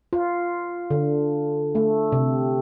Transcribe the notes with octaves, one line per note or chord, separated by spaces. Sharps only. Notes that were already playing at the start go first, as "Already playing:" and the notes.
F4
D3
A3
C3